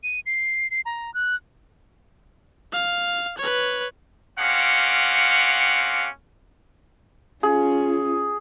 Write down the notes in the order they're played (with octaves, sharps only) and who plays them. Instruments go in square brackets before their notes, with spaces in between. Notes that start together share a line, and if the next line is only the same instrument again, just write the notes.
[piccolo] D#7
C7
C7
A#5
F#6
[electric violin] F5
B4 C#5
[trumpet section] A#3 C4 C#4 G4 F5 F#5
[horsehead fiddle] C#4 F4 [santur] G#4